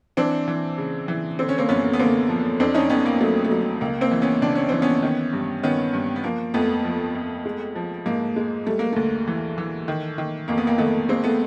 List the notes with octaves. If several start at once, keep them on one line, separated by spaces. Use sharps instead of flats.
E3 C4 D4
E3
C#3
E3
D3 C4
C#4
A#3 C4
F#2 B3 C#4
B3
D3 A#3 C4
F3
F2 C4 D4
C#4 D#4
F2 B3 C#4
A#3
F#3 A3
A3
F#3
C#2 A#3
A#3 C4
E3
B3 C#4
C#2 D4
C#4
E3 C4
B3 C#4
D#3
G2
D#3 B3 C#4
G2
B3
F3 A#3
F2 A3 B3
F3
F2
G#3
F3
G#2 A#3
G#3
G3 A3
A#3
D2 A3
E3
E3
D#3
D#3
F2 A#3
B3
A#3
D#3 A3 B3
G#3 A#3 C4
A3 B3